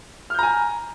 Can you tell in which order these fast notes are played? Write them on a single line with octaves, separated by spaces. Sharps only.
F6 G6 A#5 G#5